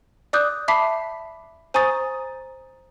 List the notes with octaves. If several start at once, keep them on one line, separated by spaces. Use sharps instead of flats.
D5 D6 D#6 F#6 G6
E5 A5 B5 D6 B6 C7
C5 G#5 A#5 C#6 D#6 A6